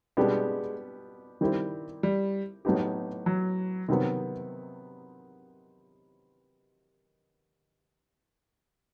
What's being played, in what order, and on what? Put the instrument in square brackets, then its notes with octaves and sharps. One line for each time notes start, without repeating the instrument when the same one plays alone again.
[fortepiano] B2 G3 B3 D4 G4 [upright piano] G#3
[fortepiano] D#3 G3 C4 E4 G4
[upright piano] G3
[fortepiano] A2 F#3 B3 D#4 G4
[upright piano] F#3
[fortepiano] C3 D#3 F#3 B3